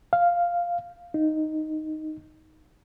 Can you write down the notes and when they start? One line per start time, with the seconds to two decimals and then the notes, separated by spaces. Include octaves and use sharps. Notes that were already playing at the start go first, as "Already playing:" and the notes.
0.13 F5
1.14 D#4